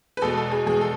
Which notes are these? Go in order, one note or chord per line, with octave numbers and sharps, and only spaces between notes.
B4
E2 B2 G#3 A4
A4
G#4
E2 B2 G#3 G#4
A4